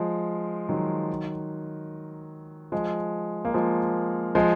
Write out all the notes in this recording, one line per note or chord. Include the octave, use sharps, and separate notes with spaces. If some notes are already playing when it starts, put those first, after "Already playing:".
Already playing: F3 G#3
D#3 F#3
F3 G#3
A#3
F3 G#3
F3 G#3